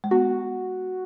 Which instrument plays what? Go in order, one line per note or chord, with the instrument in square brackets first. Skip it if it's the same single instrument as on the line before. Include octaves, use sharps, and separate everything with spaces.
[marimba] G#3
[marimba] B3 [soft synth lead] F#4